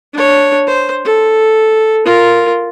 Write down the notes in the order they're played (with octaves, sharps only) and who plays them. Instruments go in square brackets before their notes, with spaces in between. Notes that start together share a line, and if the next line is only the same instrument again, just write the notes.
[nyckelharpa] D4 C#5
C5
A4
F4 A#4